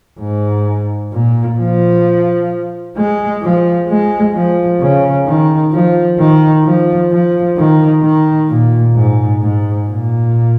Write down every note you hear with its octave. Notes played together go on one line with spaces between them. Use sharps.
G#2
A#2
F3
G#3
F3
G#3
F3
C#3
D#3
F3
D#3
F3
F3
D#3
D#3
A#2
G#2
G#2
A#2